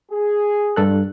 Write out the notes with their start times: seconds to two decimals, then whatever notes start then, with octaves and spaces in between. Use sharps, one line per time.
0.11 G#4
0.76 G2 A4 F#6